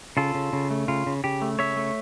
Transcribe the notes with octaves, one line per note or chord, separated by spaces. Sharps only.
C#3 F4 A4
C#3
C#3
A3
C#3 F4
C#3
C#3 G4
A3
C#3 C#5 E5
A3